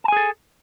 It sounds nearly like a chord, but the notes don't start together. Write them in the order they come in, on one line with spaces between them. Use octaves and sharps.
A5 G#5 G#4 A4